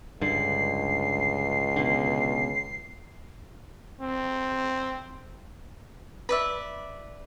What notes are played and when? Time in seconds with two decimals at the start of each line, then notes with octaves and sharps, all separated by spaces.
0.21 C#2 G2 D3 C7
1.76 B2 D3
4.02 C4
6.29 B4 D5 E5